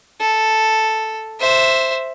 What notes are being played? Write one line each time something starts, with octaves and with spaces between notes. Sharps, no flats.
A4
C5 E5